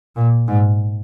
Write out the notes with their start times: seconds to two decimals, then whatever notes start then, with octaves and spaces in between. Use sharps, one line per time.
0.16 A#2
0.48 G#2